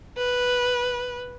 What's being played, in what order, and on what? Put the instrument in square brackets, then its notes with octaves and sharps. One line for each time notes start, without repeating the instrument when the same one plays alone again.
[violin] B4